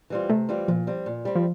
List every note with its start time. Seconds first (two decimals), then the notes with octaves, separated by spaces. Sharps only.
0.10 E3 G3 C4 F4
0.30 C3 A3
0.49 E3 G3 C4 F4
0.68 A#2 F3
0.87 G3 C4
1.06 A#2
1.25 G3 C4
1.36 F3